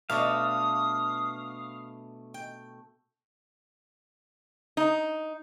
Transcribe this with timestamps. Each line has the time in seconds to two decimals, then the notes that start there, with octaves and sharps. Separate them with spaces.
0.10 B2 A3 D4 B4 F5 D#6
2.34 G5
4.77 D#4